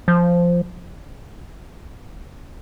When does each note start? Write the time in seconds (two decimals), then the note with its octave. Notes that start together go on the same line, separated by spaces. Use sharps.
0.08 F3